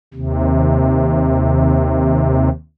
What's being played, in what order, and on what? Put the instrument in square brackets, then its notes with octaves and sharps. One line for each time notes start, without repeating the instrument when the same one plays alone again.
[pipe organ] D#2 C3